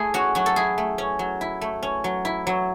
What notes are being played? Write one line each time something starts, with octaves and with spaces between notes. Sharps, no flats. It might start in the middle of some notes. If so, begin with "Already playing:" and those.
Already playing: A3 E4 G#4
C#4 F#4
F#3 F#4
A4
E4 G#4
A3
C#4
F#3
E4
A3
C#4
F#3
E4
F#3